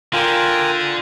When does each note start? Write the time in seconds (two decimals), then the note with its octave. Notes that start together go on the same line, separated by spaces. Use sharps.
0.13 D3 F4 A#4 G5 G#5